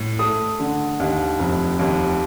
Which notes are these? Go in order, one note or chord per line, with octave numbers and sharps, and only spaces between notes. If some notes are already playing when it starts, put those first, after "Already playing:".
Already playing: A2
A3 D#6
D3
D#2
F1
D#2